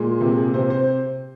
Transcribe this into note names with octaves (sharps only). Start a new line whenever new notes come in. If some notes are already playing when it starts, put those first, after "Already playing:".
Already playing: A#2 G#3
C3 F4
G#4
C3 C5
C5